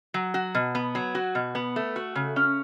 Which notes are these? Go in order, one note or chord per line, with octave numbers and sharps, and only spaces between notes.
F#3
F#4
B2
B3
F#3
F#4
B2
B3
A3
F#4
C#3
C#4